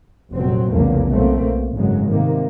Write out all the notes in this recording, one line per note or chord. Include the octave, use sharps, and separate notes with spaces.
F1 A#2 F#3 C4
F1 B1 E2 C#3 A3 A#3
B1 A3 A#3 C4
B1
G#1 F#2 C#3 F#3 G#3
G#2 C3 D#3 A#3